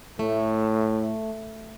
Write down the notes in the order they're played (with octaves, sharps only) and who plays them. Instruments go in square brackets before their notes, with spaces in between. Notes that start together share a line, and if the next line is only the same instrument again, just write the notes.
[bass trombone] A2 [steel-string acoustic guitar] A3